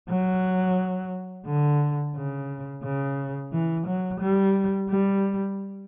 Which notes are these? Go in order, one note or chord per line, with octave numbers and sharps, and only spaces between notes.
F#3
D3
C#3
C#3
E3
F#3
G3
G3